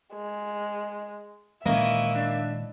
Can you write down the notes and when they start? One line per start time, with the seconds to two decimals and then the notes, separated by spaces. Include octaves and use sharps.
0.15 G#3
1.66 A#2 D#3 E3 G#3 A#3 C#4 D#5 E5
2.15 D4